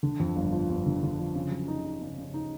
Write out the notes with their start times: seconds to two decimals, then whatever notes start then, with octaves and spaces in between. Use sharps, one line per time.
0.03 D3
0.20 F2
0.36 G1
0.52 F3
0.69 G1
0.86 D3
1.03 D3
1.19 F3
1.35 C#3
1.51 F#3
1.68 D#4
1.85 D#4
2.01 C#3
2.18 C#3
2.34 D#4